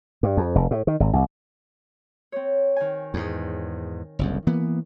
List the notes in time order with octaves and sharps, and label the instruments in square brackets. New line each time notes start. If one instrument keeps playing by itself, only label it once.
[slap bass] G2
F2
F1
A2
D#3
G#1
C2
[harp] C4 C#5
D#3 G#5
[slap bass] E2 G#2
F#1 C2 F2
E3 A#3 B3